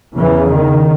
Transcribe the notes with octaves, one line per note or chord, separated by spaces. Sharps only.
E2 C#3 E3
D#3